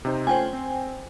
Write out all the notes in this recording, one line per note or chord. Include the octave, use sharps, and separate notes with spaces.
C3 D#4 C5
A3 C#4 F4 C5 G5 G#5
C4